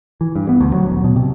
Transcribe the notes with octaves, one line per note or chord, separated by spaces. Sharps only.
E3
G2
B3
D2
F#3
D#1
B2
C3